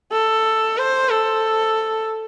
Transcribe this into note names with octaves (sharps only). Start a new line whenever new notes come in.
A4
C5
A4